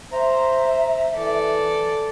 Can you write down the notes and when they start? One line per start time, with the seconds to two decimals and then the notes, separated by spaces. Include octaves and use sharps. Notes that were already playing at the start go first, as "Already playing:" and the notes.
0.12 C5 E5 A#5
1.13 E3 A4 D5